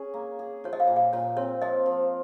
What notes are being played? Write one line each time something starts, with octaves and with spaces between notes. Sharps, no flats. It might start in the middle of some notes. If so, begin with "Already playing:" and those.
Already playing: C#4 G#4
A#3
G#4
F3 C#5
D#5
F5
A#2
F5
A#2 C#5
C4 C#5
F3 D#5
F3